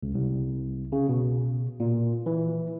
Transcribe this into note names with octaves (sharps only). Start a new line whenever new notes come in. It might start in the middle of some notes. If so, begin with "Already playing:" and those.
C#2
C2
C#3
B2
A#2
E3